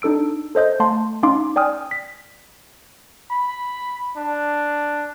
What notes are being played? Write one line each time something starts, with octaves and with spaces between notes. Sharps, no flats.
D4 D#4 A4 E6 D7
A4 C5 D#5 G6
A3 F5 A5 C6
C#4 D#4 F5 C6 D6
D5 G5 G#5 D#6 F6
B6
B5
D4